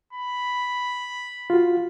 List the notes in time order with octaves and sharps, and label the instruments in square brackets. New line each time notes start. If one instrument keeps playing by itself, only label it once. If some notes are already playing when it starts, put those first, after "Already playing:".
[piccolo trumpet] B5
[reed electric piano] F4 F#4